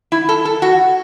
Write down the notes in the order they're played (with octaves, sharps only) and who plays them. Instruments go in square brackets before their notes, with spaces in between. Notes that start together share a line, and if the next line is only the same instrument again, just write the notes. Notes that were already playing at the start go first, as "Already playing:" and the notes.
[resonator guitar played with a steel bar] E4
A4
A4
F#4